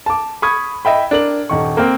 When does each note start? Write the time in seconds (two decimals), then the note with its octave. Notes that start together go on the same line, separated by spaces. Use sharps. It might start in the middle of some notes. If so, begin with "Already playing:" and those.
0.06 A5 D6
0.42 B5 C#6 D#6 G#6
0.85 D#5 E5 G5 B5
1.11 D4 A#4 F#7
1.49 D#1 D#3 C#6
1.77 A#3 C4